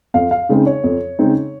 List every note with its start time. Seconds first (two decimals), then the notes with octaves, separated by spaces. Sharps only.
0.14 F2 F5
0.31 F5
0.49 C#3 G#3 C4 D#4
0.66 C#5
0.84 F2
1.19 C#3 G#3 C4 D#4